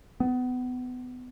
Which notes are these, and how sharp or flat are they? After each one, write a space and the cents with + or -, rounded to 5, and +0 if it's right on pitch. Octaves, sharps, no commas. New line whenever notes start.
B3 +25